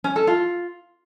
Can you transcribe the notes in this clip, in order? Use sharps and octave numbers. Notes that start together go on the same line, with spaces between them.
C#4
A4
F4